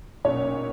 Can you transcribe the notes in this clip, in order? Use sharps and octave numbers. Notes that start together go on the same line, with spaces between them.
B1 A#2 A#3 C#4 C#5